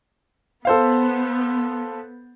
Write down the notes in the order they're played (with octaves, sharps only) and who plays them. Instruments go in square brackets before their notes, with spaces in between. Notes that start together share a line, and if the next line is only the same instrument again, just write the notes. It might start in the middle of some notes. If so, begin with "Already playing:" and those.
[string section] B3 [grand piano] A4 C5 F5